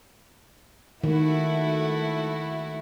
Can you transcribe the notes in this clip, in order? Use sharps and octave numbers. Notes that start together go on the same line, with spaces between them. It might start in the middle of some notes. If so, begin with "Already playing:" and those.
D#3 A3 E4 F#4